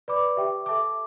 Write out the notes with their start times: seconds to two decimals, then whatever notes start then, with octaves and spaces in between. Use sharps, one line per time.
0.08 B4 D5 B5 D6
0.37 G4 E5 G5 D6
0.66 A4 E5 A5 D6